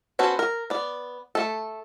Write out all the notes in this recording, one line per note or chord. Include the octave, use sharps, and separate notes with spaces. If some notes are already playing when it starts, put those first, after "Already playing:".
B3 C#4 F#4 A4 C5
A#4
B3 D5
A3 A4